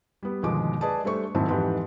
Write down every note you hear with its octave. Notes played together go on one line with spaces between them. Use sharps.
G3 B3
G1 D#2 B2 F3 G#3 D6
G#4 B4 D5 D#5 A5
G3 A3 D4 C5 C#6
D#1 G#2 F#3 C4 E4 A5
F2 G#2 E3 G4 B4 A5